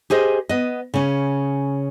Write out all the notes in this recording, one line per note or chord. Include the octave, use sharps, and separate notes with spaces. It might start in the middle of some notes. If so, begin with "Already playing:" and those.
G4 G#4 C5 D#5
B3 D#5
C#3 C#4